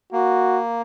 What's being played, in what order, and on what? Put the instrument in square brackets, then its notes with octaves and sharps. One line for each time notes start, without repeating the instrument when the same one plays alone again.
[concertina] A#3 [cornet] F#4